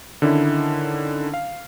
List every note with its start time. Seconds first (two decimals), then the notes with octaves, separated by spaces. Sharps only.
0.22 D3 D#3 C#4 D4 E4
1.34 F5